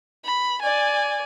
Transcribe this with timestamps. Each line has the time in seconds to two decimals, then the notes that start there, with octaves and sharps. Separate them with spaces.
0.25 B5
0.62 D5 G#5